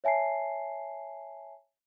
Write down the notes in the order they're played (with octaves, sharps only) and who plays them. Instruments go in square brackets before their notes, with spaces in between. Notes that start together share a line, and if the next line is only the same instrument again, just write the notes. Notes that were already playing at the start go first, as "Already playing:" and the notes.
[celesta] C#5 E5 G#5 A5 C7